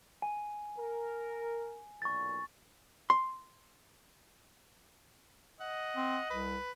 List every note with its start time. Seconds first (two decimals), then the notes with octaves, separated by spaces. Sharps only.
0.22 G#5
0.78 A#4
2.02 B1 A#2 C#6 A6
3.10 C6
5.61 D#5 F#5
5.97 C4
6.30 C2 B4